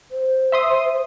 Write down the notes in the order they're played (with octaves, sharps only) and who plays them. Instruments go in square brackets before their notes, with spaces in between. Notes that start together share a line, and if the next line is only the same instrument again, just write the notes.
[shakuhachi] C5
[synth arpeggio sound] E5 C6 D#6